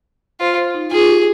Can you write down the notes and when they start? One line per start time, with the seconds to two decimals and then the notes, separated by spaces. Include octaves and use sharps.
0.40 F4 C5
0.57 C5
0.75 D#4
0.91 F4 G#4
1.09 G4